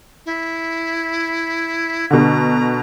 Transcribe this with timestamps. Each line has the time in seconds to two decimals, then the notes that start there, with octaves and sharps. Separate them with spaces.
0.26 E4
2.11 B2 D3 A#5